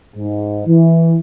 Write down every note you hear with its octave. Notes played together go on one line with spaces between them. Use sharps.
G#2
E3